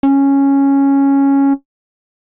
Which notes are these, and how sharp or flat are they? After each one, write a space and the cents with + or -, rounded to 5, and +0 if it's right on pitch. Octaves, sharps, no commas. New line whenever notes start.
C#4 -5